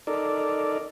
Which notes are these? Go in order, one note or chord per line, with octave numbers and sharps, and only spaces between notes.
D#4 A4 A#4 D5